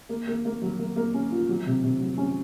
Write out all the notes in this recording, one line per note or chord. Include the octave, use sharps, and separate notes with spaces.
A#3
A#3
A#3
F#3
A#3
A#3
C#4
F4
F#3
C3
C3
F#3
C#4